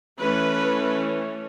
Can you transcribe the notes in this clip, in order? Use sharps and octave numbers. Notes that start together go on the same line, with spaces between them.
E3 A3 C#4 B4